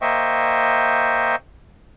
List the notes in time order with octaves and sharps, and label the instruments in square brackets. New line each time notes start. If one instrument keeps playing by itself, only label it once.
[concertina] A#3 C5 D#5 E5 G5 C#6